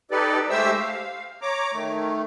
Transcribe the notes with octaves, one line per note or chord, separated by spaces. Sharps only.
D#4 G4 A4 B4 D5
G#3 A3 G4 C5 E5 E6
F5
C#5 A#5 D6
D#3 A3